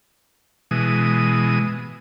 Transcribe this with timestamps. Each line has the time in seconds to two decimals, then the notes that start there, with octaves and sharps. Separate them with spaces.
0.71 B2 E3 G#3 D#6